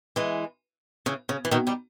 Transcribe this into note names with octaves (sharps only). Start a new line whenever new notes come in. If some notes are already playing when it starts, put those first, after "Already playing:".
E3 G#3
C#3 E3
C#3
E3
B2 D#3
D#3 G3